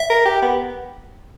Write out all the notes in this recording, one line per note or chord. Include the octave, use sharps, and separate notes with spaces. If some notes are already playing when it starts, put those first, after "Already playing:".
Already playing: E5
A#4
G4
B3